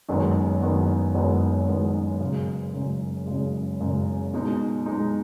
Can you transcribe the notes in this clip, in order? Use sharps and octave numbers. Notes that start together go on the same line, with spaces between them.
F#1 F#2 D#3 G#3 B3
F#1 F#2 D#3 G#3 B3
F#1 F#2 D#3 G#3 B3
F#1 F#2 D#3 G#3 B3
F#1 F#2 C#3 G#3
F#1 F#2 C#3 G#3
F#1 F#2 C#3 G#3
F#1 F#2 C#3 G#3
B2 G#3 D#4
B2 G#3 D#4